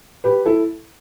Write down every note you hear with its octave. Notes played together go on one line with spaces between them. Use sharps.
G4 B4
E4 A4